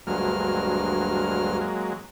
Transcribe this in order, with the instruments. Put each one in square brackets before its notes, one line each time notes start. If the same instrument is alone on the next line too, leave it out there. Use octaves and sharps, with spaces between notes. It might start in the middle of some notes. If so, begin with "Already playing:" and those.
[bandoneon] D2 G2 F6 [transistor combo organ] F#3 G#3 A#3